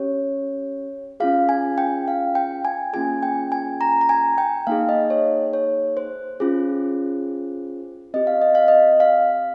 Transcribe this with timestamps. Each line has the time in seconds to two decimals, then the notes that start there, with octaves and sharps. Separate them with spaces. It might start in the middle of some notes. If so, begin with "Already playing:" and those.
Already playing: C#4 G4 C#5
1.20 C#4 F4 G#4 F5
1.49 G#5
1.78 G5
2.08 F5
2.35 G5
2.65 G#5
2.93 A#3 C#4 F4 G#4 G#5
3.23 G5
3.52 G#5
3.81 A#5
4.01 A#5
4.09 G#5
4.38 G5
4.67 A#3 D#4 G#4 F5
4.89 D#5
5.10 C#5
5.53 C#5
5.97 C5
6.40 C#4 F4 G#4
8.14 C4 G4 D#5
8.27 F5
8.41 D#5
8.55 F5
8.68 D#5
9.00 F5